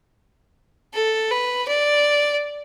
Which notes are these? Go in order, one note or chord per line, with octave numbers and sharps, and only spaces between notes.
A4
B4
D5